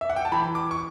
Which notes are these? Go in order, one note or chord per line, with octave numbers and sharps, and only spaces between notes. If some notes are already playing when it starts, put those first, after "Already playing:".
E5
F#5
G5
A5
E3 B5
D6
C#6